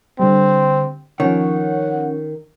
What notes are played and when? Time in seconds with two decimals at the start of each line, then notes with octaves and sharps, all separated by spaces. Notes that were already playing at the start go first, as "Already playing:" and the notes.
0.20 D3 G3 C4
1.20 D#3 F3 C#4 C#5 F#5